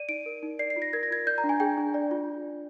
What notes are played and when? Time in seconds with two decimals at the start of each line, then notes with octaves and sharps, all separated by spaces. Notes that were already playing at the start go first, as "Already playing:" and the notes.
Already playing: D5 D#7
0.09 D#4 D7
0.26 A#4
0.43 D#4
0.59 D5 C7
0.70 C7
0.76 F4
0.82 A#6
0.93 A#4 G#6
1.03 A#6
1.10 F4 G#6
1.26 D5 G6
1.38 A#5
1.44 D4
1.49 G#5
1.60 G#4 G5
1.78 D4
1.94 D5
2.11 F4